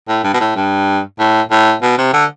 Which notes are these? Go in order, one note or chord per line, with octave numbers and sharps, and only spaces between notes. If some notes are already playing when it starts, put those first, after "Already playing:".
A2
G2
B2
A2
G2
A2
A2
B2
C3
D3